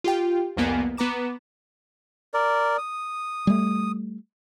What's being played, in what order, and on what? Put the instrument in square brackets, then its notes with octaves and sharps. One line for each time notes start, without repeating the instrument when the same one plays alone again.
[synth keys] F4 G4 G5
C2 F2 A#3 B3 G#5
B3 B4 A#5 D6 E7
[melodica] A#4 D5
D#6
[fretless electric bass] G3 A3